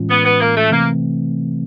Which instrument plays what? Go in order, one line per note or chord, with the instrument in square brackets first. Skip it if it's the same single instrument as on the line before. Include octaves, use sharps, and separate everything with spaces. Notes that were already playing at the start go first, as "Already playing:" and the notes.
Already playing: [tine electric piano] A2 E3 G#3 C#4 F4
[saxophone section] B3
B3
A#3
A3
[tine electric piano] C3 E3 A3 C4 [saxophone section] A#3